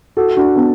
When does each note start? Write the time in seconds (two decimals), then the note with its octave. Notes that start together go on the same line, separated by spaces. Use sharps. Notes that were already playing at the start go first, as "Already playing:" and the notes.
0.17 F#4 A4
0.37 D4 F#4
0.56 B3 D4